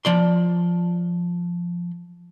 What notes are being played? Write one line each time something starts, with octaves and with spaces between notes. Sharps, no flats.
F3 D5 C6